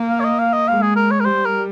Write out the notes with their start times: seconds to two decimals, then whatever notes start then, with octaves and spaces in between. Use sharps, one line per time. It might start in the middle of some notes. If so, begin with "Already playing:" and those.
Already playing: A#3
0.09 F5
0.20 C#5
0.24 D#5
0.39 F5
0.53 D#5
0.68 G#3 F5
0.82 G#4
0.96 A#4
1.11 C#5
1.20 A#4
1.25 G3 C5
1.45 A#4